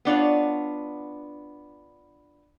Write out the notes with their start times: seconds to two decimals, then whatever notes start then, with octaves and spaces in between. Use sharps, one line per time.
0.05 B3 D4 F4 C#5